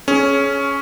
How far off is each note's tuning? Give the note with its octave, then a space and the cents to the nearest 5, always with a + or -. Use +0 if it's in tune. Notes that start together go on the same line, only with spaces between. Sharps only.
C#4 +0 G#4 +30